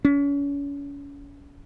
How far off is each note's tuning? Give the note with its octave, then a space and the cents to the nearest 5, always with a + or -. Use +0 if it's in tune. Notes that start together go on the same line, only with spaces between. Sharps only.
C#4 +35